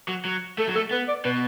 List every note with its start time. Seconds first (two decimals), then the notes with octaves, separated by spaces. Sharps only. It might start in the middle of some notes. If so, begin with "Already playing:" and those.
0.08 F#3
0.25 F#3
0.58 A3 A4
0.67 F#3
0.75 A3 A4
0.91 B3 B4
1.08 D5
1.25 B2 B4